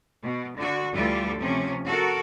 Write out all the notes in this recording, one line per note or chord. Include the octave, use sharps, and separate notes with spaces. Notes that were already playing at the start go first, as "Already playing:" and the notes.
B2
D3 F#4
D2 E3 G3 F4 A4
C3 F3 C#4
F#4 A4 A#4